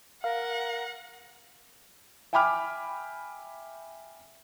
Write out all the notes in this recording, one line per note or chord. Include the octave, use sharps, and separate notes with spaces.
A#4 F5 F#5
E5 G5 G#5 B5 D6 F6